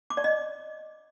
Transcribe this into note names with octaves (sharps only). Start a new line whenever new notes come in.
D6
D5
D#5